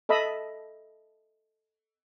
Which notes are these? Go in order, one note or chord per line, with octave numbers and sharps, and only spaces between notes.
A4 D#5 E5 B5 E6